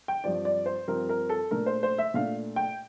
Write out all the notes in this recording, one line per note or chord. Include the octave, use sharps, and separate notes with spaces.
G5
G2 F3 C4 D5
D5
C5
G2 F3 C4 A#4
A#4
A4
A#2 A3 D4 A#4
C5
C5
E5
A#2 A3 D4 F5
G5